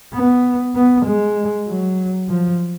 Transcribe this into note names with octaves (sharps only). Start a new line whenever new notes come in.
B3
B3
G#3
F#3
F3